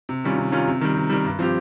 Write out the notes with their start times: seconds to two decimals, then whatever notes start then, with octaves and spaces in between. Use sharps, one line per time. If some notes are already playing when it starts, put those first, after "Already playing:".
0.09 C3
0.24 D#3 G3 C#4 F4
0.38 C3
0.52 D#3 G3 C#4 F4
0.68 C3
0.81 D#3 G3
0.96 C3
1.10 D#3 G3
1.24 G2
1.39 F3 C4 G4